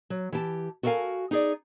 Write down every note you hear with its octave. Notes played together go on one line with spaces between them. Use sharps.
F#3
E3 G4 A5
F#4 A4 A#4 C#5 F5 G#5
D#4 G#4 D5